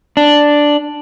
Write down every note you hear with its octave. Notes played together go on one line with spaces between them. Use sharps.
D4